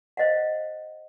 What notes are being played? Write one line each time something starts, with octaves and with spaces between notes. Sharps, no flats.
C5 D#5 F5 F#5